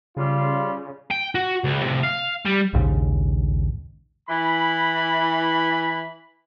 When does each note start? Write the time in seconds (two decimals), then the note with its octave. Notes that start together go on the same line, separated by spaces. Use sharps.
0.17 C#3 G3 F4
1.11 G5
1.35 F#4
1.64 C#2
1.83 A2 C3
2.03 F5
2.46 G3
2.73 A#1 D#2 G#2 C#3
4.28 E3 B5